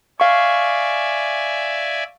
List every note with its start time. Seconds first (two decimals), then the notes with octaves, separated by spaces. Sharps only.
0.20 D5 E5 F5 G#5 C#6